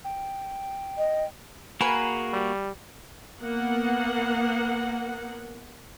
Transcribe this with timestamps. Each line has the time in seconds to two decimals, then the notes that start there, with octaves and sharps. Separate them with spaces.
0.04 G5
0.98 D#5
1.81 A#3 F#4 G#4 A#4 B4
2.33 G3
3.41 A#3 B3 F#5